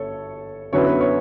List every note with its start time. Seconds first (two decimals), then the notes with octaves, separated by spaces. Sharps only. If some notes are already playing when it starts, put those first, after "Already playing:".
Already playing: G1 A4 C#5
0.73 F#2 D3 F#3 B3 E4 C#5
0.87 B4
1.01 C#5